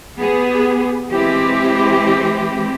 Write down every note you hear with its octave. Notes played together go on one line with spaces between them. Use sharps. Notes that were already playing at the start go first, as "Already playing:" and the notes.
B3 G4 G#4
E3 G#3 C4 E4 G4